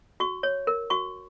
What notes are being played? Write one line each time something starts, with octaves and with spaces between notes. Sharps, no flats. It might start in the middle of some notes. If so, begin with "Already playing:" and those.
F#4 C#6
C#5
A#4
F#4 C#6